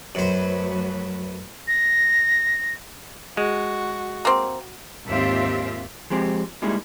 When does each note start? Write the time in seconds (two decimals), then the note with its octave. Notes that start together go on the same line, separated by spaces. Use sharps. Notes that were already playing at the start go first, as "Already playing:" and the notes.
0.15 F#2 F#3 A3 B4 C5
1.68 A#6
3.37 G#3 F#4
4.25 A#3 C4
5.08 D#2 G#2 C4 F4 G4 E5
6.10 F3 G#3 C4 G4
6.62 G3 G#3 A#3 D#4 E4 G#4